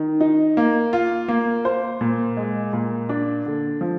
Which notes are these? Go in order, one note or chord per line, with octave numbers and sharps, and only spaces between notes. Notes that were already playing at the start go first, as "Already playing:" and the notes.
Already playing: D#3
D#4
A#3
F4
A#3
C5
A#2
G#3
A#2
D4
D3
F3